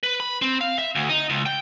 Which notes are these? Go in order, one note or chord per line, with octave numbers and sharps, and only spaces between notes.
B4
B5
C4
F5
E5
D2
D#4
C#2
G5